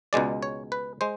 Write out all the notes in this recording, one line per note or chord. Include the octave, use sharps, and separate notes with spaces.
C#2 B2 G#3 D5
C#5
B4
G#3 C5